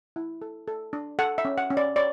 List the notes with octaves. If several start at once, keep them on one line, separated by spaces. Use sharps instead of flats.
E4
A4
A4
D4
A4 F#5
E5
C#4
F#5
C#4
D5
C#5 D5